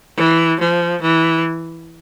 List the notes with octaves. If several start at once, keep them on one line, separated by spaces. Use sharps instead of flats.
E3
F3
E3